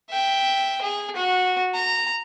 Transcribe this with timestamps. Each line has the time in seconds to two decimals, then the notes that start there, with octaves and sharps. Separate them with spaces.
0.11 E5 G5
0.82 G#4
1.16 F#4
1.75 A#5